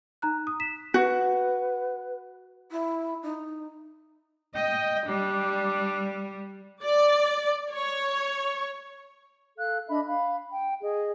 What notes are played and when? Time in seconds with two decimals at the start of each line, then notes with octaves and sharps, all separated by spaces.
0.22 D#4 A#5 F#6
0.47 D#6
0.60 B6 E7
0.94 F#4 B4
2.71 E4
3.23 D#4
4.56 D#5 G5
5.08 G3 D4
6.83 D5
7.72 C#5
9.57 A4 F5 F#6
9.89 D4 D#5 E5 B5
10.07 F5 B5
10.52 G5
10.82 G#4 D#5